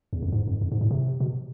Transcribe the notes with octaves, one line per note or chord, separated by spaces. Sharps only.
E2
F2
G#2
F2
F2
G#2
A2
C3
B2